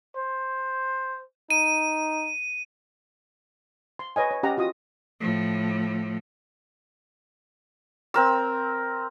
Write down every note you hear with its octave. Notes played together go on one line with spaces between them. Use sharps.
C5
D#4 D#7
C6
B4 C#5 D#5 G#5
C#5
C#4 G4 D#5 F#5 A#5 D#6
F4 F#4 D#5 D#6
A2 F3
C4 A#4 E6